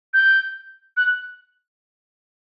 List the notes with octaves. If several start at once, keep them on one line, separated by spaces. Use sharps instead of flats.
G6
F#6